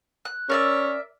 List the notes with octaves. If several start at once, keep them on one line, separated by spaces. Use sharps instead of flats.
F#6
C#4 A#4 D5 E5